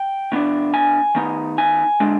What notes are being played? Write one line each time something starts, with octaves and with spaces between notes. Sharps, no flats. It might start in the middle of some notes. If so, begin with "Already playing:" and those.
Already playing: G5
B2 B3 D4
G#5
D#3 B3 D#4
G#5
D3 G#3 D4